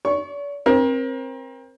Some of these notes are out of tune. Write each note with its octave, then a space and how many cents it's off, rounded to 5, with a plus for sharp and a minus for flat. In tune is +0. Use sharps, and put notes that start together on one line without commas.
D5 -45 C#6 +0
C4 +25 A#4 +30